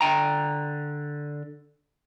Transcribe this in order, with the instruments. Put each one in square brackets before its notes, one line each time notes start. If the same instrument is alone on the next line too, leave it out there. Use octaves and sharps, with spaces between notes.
[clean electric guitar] D3 G5 A#5